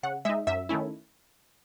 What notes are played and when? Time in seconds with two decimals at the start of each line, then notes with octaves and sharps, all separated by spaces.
0.03 C#3 F#5
0.25 G#3 D#4 E5
0.47 F#2 E5
0.69 D#3 A3 C#4 E4